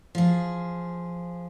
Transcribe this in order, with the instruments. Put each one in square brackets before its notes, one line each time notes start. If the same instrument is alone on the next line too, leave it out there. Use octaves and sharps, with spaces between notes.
[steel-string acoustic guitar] F3 G#4